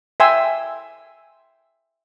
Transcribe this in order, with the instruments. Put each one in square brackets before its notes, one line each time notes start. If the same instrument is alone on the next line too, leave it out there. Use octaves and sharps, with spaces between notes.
[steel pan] E5 G5 G#5 C6 E6